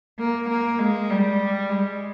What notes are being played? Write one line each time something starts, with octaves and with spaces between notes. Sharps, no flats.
A#3
A#3
G#3
G3
G#3